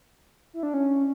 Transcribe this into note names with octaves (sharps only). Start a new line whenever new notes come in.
E4
D4
C#4